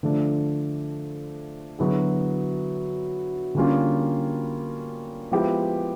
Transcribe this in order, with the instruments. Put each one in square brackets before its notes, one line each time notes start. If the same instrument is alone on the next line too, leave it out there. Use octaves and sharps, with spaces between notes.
[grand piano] D3 F3 A3 D4
D3 F#3 B3 E4 G#4
D3 G3 A#3 C#4 F4
F3 G#3 B3 E4 G4